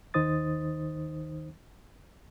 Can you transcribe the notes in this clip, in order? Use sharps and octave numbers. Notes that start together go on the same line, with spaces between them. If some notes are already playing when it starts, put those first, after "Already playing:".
D#2 D#3 D#4 C5 D#6 A6